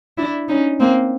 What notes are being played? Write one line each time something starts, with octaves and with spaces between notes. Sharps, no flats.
D4 E4
C#4 D#4
A#3 C4